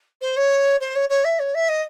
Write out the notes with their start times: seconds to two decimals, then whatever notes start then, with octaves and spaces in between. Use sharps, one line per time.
0.22 C5
0.37 C#5
0.81 C5
0.96 C#5
1.09 C#5
1.24 E5
1.39 C#5
1.55 E5
1.69 D#5